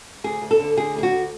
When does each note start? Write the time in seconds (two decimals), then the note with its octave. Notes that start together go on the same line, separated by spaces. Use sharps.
0.24 D2 G#4
0.41 D2
0.51 A4
0.59 D3
0.77 D3 G#4
0.94 D2 G#4
1.03 F#4
1.12 D2